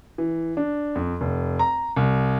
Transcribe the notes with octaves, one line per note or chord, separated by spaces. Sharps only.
E3
D4
F2
F1
A#5
C2